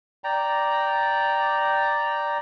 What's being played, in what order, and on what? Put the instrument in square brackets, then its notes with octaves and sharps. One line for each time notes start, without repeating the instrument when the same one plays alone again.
[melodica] D5 G5 A#5